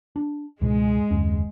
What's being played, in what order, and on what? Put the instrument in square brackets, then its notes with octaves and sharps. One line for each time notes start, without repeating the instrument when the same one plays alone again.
[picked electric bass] D4
[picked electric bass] C#2 G#2 B2 [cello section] G#3
[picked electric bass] F#1 D#2 C#4